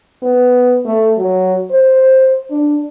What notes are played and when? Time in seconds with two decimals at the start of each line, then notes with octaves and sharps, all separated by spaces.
0.23 B3
0.85 A3
1.17 F#3
1.71 C5
2.51 D4